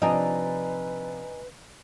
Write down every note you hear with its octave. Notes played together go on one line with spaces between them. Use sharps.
C3 F3 D4 D#4 B4 D#5 G#5 A#5